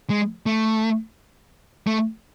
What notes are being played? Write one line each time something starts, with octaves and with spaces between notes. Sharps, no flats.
G#3
A3
A3